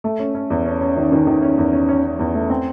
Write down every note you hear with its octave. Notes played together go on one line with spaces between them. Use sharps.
A3
C#4
C#4
E2
C#4
C#4
D#3
D#3
D#3
C#4
E2
C#4
C#4
C#4
E2
A3
C4